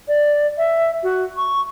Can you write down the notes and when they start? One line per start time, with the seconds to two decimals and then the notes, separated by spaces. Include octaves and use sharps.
0.08 D5
0.58 E5
1.03 F#4
1.37 C#6